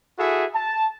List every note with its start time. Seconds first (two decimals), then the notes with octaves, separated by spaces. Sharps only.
0.18 E4 F#4 G#4 A4 E5
0.53 A5